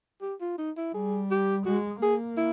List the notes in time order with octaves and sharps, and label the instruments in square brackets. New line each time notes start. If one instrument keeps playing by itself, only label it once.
[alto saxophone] G4
F4
D#4
E4
[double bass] G3 [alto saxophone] G#4
[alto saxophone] G4
[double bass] G#3 [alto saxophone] F#4
[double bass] A#3 [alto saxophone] G#4
[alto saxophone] E4